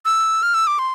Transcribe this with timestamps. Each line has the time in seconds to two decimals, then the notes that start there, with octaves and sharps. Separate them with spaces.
0.05 E6
0.43 F6
0.54 E6
0.67 D6
0.79 C6